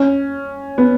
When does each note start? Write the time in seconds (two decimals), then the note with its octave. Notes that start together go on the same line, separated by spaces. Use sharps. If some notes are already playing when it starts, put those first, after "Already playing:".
Already playing: C#4
0.78 B3